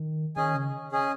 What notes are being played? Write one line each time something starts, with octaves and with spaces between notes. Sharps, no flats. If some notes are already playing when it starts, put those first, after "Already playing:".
Already playing: D#3
D#3 C#4 G#4 D#5 G#5
C#3
C#4 G#4 D#5 G#5